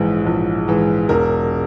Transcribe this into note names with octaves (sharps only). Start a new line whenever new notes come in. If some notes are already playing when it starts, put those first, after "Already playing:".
Already playing: A#1 G#2 E3
A#1
G#2 E3
E1 A#4